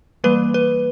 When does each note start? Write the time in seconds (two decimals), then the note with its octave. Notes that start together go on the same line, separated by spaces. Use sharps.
0.24 E3 G3 A#3 B4
0.54 B4